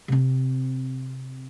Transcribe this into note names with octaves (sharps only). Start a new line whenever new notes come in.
C3 C4